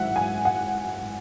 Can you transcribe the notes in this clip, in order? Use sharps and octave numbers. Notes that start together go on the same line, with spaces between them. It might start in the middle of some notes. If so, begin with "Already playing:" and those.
Already playing: G#1 F#2 E3 E5 F#5
G#5
F#5